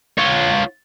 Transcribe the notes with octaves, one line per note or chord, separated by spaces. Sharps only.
F4 C#5